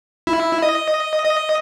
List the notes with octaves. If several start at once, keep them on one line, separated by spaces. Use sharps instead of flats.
E4
D#5
D#5